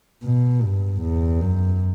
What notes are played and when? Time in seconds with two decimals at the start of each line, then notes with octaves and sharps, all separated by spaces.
0.24 B2
0.63 G2
1.02 E2
1.41 F#2